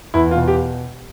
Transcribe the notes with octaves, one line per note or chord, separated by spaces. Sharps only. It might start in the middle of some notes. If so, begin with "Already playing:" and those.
E2 E4
F4
B2
G4